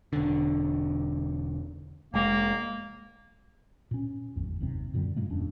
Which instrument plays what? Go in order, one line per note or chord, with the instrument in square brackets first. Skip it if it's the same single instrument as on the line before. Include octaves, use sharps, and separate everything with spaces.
[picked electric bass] E1 D3
[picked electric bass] F1 G#3 [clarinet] A#3
[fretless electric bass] A#2 C#4
D1 G#1 E2
F#1 D#2 C3 C4
F#2 A#2 D3 G3
G2 A#2 G#3 A#3
D#1 F2 C#4 D4